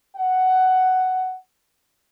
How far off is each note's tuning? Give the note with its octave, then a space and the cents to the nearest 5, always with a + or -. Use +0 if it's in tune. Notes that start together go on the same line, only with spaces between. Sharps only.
F#5 +10